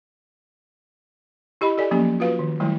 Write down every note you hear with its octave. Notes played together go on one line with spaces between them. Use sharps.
E4 G4 D#5 B5
G4 A4 D5 D#5 G#5
F3 F#3 A#3 B3 C#4 G4
F4 F#4 B4 F5
D#3
D#3 F#3 G3 A3 E4